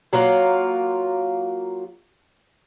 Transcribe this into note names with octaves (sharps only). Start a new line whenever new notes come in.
F#3 A#3 F4 F#5